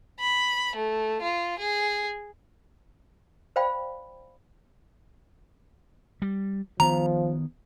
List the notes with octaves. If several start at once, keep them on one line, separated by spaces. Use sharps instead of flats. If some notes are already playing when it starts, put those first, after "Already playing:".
B5
A3
F4
G#4
C5 D5 F5 G5 B5
G3
D#3 F3 B3 A#5